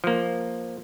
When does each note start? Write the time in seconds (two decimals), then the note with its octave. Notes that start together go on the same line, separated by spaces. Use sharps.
0.04 F3 A#3